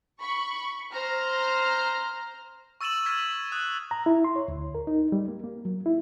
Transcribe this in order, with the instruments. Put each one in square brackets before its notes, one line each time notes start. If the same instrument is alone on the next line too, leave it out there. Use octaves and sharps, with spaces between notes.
[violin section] B5 C#6
C5 A#5 F6
[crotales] C#6 E6 A6 D#7 E7 F#7
E6 F6 G#6 B6
D#6 F#6
[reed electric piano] A#5
E4
C6
C#5
D2
A#4
D#4
G3
A#3
A#3
F#3
E4